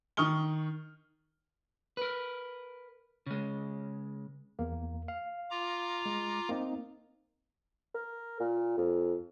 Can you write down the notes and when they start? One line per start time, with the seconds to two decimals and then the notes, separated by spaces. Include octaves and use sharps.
0.17 D#3 C#6 D#6 F6 G7
1.97 A#4 B4
3.26 C#3 G#3
4.59 E2 A#3
5.08 F5
5.51 F4 A#5 D6
6.06 G#3
6.49 A#3 C4 D#4
7.95 A#4
8.40 A#2
8.78 F2